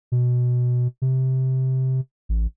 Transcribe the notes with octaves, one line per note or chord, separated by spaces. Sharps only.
B2
C3
A1